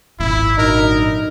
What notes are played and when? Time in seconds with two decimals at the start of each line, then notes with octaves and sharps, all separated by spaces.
0.20 G#1 A#2 E4
0.58 D3 F#3 D#4 A#4